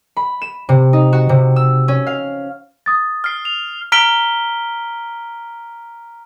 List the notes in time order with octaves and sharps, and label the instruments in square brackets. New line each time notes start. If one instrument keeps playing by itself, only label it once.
[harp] B5
E7
C3
D#4
F#4
C3
E6
C#4
F5
[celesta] D#6 A6
[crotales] F6 C7
F7
[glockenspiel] A#5 F6 B6 D7 G7